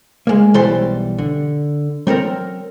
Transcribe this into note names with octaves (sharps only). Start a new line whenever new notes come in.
G#3 A#3
B1 E3 G3 A4 C5 C6
D3
F#3 C4 A4 A#4